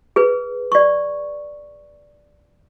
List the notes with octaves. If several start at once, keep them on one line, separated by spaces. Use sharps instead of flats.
G#4 B4
D5 C#6